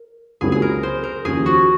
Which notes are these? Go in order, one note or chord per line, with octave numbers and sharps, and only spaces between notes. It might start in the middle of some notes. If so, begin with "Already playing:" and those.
Already playing: A#4
C#2 C3 F#3 A#3 G#4
G#4
A#4
C5
A#4
D#2 C#3 F3 G#4
F#4